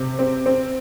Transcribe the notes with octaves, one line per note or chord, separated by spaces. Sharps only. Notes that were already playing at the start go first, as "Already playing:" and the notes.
Already playing: C3
C4
C4